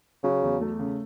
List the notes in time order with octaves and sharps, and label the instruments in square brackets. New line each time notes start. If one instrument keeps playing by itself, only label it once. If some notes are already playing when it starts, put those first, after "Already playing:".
[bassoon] C#3 [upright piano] F#3
[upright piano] E2
A3
C#3